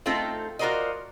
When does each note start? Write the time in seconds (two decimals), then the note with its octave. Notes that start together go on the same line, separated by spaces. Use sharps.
0.06 A3 C4 D#4 F4 A4
0.59 F4 F#4 A#4 C5 D5 D#5